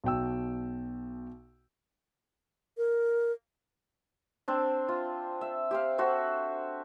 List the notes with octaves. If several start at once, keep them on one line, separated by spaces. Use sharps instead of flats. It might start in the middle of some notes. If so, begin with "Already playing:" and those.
B1 B2 G5 E6
A#4
C4 D4
F4
E5
G4 C5 F5
F#4 A4 C5 E5